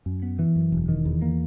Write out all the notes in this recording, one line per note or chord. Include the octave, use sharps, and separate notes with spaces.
F#2
B3
E3
F#2
E1
D#3
E2
A#3